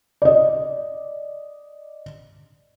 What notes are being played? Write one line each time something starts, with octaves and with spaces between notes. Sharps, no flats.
D5 D#5